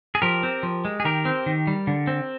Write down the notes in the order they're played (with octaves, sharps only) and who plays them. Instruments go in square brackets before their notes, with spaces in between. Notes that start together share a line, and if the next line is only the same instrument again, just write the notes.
[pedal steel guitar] G#4
F3 G4 A#4
C4
F3
G#3
G#4
D#3 G4 A#4
C4
D#3
G3
D3
C4